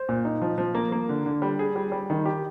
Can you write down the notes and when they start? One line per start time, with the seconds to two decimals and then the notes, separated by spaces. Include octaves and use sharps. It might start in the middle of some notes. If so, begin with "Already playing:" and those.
Already playing: C5
0.09 A#2
0.25 D#4
0.42 F3
0.58 F3
0.75 A#3
0.92 A#3
1.09 D3
1.26 D3
1.42 G3
1.59 G#4
1.76 G3
1.92 G3
2.10 D#3
2.25 G4